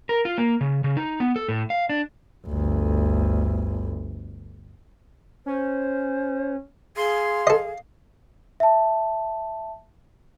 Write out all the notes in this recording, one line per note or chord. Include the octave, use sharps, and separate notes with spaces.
A#4
F4
A#3
C#3
C#3
D#4
B3
A4
A2
F5
D4
G1 D2
C#4 C5
G#4 F5 C6
A4 D#5
E5 A5